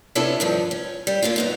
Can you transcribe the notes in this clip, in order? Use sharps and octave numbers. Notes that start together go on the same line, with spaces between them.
C3 B3 C#4 D4 E4 A4
G2 D#3 F3
C#4
G3
D3 A#3 C#4 F4
F#2 B3 D#4